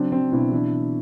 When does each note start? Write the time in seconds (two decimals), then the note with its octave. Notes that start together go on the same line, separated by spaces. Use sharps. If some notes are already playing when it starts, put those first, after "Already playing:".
Already playing: C#3 F#3 C4 D4
0.12 F#3 C4 D4
0.32 B2 D4 E4
0.52 E3 D4 E4